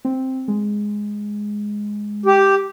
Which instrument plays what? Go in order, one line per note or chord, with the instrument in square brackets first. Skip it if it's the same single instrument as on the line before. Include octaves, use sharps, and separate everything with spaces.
[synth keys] C4
G#3
[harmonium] G4